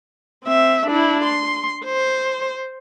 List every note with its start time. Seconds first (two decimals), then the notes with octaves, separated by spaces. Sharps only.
0.44 C4 E5
0.86 D4 E4
1.24 C6
1.85 C5